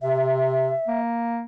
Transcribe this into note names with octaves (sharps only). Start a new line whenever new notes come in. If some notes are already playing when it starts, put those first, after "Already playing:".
C3 E5
A#3